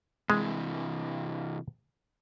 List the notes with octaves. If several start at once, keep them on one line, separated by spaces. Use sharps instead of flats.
C3 E3 G#3